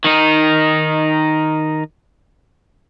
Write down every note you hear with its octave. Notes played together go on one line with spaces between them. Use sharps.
D#3 D#4